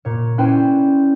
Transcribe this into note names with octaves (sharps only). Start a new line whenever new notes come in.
A#2 C#5
C#4 E4 B4 C5 D5 G5